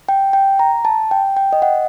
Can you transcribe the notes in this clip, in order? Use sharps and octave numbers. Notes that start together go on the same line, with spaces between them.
G5
G5
A#5
A5
G5
G5
D#5
F#5